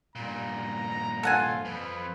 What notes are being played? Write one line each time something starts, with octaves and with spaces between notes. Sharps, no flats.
G2 A#2 A#5
F4 A4 F#5 G#5
F2 B4